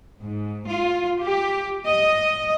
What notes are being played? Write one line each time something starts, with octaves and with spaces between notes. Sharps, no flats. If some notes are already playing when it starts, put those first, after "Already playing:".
G#2
F4
G4
D#5